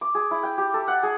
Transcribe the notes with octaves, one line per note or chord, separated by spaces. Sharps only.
D6
G#4
E4
G5
G4
A4
F#5
G#4